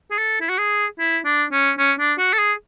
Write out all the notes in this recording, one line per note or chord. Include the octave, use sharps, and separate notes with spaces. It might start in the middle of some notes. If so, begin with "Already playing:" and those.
G#4
A4
E4
F#4
G#4
E4
D4
C#4
C#4
D4
F#4
A4
G#4